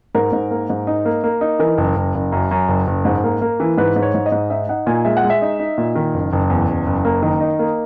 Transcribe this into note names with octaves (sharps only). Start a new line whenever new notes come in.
G#2 A#4
G#2
A#3
G#2
D#4
A#3
A#3
D#4
E3 A#4
F#1
F#1
F#1
F#2
F#2
F#1
F#1
G#2
A#3
A#3
E3
G#2 B4
G#2
C#5
G#2
D#5
G#2
D#4 E5
D#4 F#5
A#2 G#5
G#3 E5
F#5
G#3
E5
D#4
D#4
A#2
D#3
F#1
F#1
E2
F#1
F#1
A#3
D#3
D#4
A#3